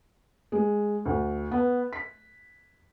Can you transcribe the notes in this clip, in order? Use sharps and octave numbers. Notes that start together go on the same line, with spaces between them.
G#3
D2
B3
B6